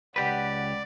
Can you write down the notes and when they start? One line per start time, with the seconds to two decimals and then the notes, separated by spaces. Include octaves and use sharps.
0.16 C#2 G4 B4 D5 F#5